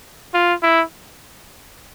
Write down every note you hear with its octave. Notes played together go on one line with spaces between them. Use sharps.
F4
E4